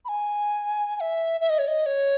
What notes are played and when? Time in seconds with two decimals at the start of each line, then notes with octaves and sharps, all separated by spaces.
0.05 B5
0.09 G#5
0.96 G#5
1.01 E5
1.41 E5
1.50 D#5
1.59 C#5
1.68 D#5
1.86 C#5